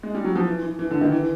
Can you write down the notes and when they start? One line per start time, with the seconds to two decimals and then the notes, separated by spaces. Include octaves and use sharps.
0.03 G#3
0.15 G3
0.24 F#3
0.35 F3
0.46 E3
0.63 E3
0.79 E3
0.91 D3
1.01 D#3
1.12 E3